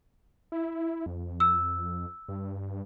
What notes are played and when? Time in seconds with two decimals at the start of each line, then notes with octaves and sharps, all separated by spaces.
0.52 E4
1.06 F2
1.40 E6
2.29 G2